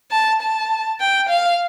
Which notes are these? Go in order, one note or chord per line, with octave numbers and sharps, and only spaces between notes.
A5
A5
G5
F5